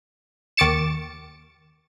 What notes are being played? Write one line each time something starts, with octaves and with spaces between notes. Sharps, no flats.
D#2 C#6 D6 A6 C#7 E7